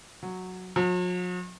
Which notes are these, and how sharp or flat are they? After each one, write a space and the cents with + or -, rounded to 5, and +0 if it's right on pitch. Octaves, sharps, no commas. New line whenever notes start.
F#3 -5
F#3 -45